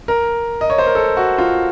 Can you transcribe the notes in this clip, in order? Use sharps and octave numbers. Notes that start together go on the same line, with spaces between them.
A#4
D#5
C#5
C5
A#4
A4
F#4
F4